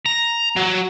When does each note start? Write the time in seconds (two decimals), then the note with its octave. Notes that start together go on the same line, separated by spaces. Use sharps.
0.06 A#5
0.56 F#3